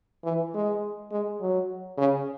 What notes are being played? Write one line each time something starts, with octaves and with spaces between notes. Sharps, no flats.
E3
G#3
G#3
F#3
C#3